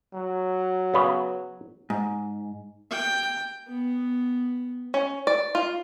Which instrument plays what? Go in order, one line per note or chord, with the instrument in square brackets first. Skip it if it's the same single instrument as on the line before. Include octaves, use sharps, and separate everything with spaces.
[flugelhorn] F#3
[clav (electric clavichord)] C#3 B3
[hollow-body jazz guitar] G#2
[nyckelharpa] G5
B3
[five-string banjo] C#4
D5
F4